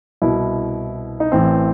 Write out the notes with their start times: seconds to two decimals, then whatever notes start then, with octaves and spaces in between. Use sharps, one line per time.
0.22 C2 B2 E4
1.20 D#4
1.32 A1 A2 E3 C4